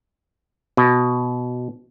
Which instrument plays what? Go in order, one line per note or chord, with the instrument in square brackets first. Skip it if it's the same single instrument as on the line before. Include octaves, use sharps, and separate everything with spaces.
[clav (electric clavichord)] B2